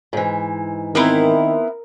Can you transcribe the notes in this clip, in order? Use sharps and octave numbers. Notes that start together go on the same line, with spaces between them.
G#2 E3
D#3 B3 C4 E4 A#4